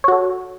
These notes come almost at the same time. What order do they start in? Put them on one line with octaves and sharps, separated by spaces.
C#5 F#4 A4